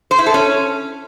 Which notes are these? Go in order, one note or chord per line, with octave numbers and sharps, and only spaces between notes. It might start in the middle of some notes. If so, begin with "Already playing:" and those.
C5
E4
A4
C#4